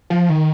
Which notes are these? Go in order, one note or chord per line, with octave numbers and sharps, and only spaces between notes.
F3
D#3